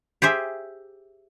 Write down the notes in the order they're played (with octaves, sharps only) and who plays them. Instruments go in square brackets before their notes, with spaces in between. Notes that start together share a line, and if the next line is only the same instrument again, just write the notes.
[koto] G4 G#4 C5 E5